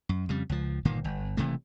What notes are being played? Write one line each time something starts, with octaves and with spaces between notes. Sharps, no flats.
F#2
F2 C#3 G3
C#2 F3
G1 A#2 D#3 A#3
G1
F#1 C3 E3 A3